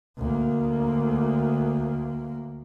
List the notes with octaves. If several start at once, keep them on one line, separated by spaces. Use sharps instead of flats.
D2 A#3